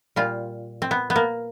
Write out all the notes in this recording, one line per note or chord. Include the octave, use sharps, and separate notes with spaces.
A#2 G3 F4
C4
B3
B3
A#3